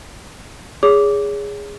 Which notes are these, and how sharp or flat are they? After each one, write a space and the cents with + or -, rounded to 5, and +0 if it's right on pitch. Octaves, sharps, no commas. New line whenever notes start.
G#4 -15 C#5 +30 D6 -10